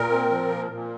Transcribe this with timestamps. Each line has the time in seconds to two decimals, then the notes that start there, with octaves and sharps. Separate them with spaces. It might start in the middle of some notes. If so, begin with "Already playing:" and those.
Already playing: A#2 A#4
0.10 C4
0.30 F3
0.50 A#2
0.71 A#2